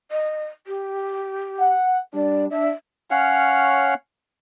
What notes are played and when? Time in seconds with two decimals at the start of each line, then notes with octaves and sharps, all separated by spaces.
0.11 D#5
0.67 G4
1.59 F#5
2.13 G3 D4 D5
2.50 D4 E5
3.11 C#4 C#5 F5 F#5